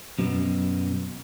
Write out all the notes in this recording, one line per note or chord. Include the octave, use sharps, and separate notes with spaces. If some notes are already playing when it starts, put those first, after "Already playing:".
F#2 B2